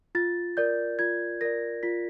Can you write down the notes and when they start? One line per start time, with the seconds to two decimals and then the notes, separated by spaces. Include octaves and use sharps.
0.15 F4 A6
0.57 A#4 D5 G6
0.99 F4 G#6
1.41 A#4 D5 A#6
1.83 F4 B6